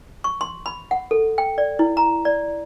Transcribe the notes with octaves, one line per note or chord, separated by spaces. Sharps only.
C#6
C6
B5
F#5
A4
G5
D5
E4
A#5
D5